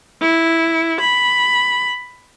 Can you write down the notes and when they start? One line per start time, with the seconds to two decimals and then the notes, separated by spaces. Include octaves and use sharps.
0.22 E4
1.01 B5